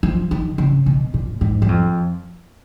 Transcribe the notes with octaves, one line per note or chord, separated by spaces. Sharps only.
F3
D#3
C#3
B2
A#2
G#2
F#2
F2